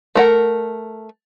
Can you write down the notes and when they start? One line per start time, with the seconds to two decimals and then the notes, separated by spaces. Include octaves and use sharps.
0.15 A3 A#4 F#5